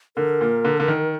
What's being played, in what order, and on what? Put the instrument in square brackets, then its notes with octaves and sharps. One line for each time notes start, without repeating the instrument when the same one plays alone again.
[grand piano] D3 [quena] A#4
[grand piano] A#2
D3
D3
D#3